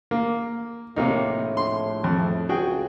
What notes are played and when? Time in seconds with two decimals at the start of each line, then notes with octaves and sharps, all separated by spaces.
0.11 A#3
0.96 A#1 A2 C3 A#3 D#4
1.57 C6
2.04 F2
2.49 C#2 F#4 G#4 G5